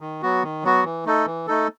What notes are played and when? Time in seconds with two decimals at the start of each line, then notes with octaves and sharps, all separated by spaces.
0.01 D#3
0.22 F#3 B3 F#4
0.43 D#3
0.64 F#3 B3 F#4
0.84 E3
1.05 A3 D#4 A4
1.26 E3
1.47 A3 D#4 A4